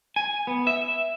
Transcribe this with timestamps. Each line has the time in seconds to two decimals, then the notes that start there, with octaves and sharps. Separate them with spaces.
0.16 G#5
0.47 B3
0.67 E5